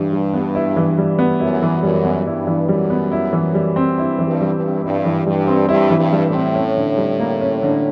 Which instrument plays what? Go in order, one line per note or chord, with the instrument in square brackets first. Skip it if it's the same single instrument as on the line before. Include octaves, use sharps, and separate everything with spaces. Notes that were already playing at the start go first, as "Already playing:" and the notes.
Already playing: [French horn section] G2 [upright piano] E3 E4
[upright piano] G3
B3
E4
E3
G3
B3
[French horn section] F#2 [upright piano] E4
[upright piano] E3
[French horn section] F#2 [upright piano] G3
[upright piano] B3
[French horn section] G2 [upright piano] E4
[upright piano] E3
[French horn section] F#2 [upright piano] G3
[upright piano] B3
E4
E3
G3
C4
[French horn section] G2 [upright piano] E4
[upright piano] E3
[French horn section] G2
[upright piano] G3
[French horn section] G2
[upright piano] C4
[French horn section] G2 [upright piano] E4
[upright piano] E3
[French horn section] G2 [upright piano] G3
[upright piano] C4
[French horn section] G2 [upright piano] E4
[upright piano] E3
[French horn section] G2
[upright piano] G3
[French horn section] A2
[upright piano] C4
C#4
D3
G3
A#3
C#4
D3